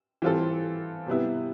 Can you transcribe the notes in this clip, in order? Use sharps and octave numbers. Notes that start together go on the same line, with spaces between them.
E3 G3 C4 F4 A4
C3 G3 B3 E4